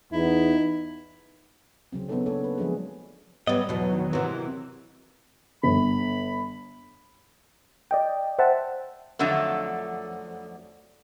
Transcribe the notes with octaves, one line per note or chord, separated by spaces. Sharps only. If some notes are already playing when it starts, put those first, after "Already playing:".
E2 B3 D#4 E4
C#3 F#3 C4
F#3 B3 D4 D#4 A4 C#5
C#3 A#3 D4 A4 C#5
B4
F3 F#3 G#3 A3 D4 G#4
F#3 G3 B3 D#5
E2 B2 F#3
D#3
C3 E3 C4 F#4 A#4
G1 B5
D5 D#5 G5
C5 E5 F#5 G5 A5
F2 D3 F#3 A3